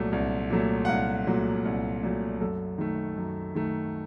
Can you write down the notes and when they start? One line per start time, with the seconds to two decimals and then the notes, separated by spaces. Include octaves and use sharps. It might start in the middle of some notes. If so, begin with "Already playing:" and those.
Already playing: C2 A#2 F#3 A3
0.12 C2
0.50 A#2 F#3 A3
0.85 F#5
0.88 C2 F5
1.27 A#2 F#3 A3
1.65 C2
2.03 A#2 F#3 A3
2.41 F#2 A4
2.78 D#3 A3
3.17 F#2
3.55 D#3 A3